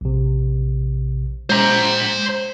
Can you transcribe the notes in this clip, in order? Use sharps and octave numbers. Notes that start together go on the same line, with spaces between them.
A#1 C3
G#3 C5 A#5